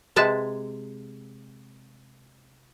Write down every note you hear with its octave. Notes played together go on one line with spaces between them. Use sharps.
C3 G#3 B4 A5